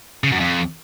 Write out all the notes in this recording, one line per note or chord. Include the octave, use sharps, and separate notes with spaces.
C#3
F#2
F2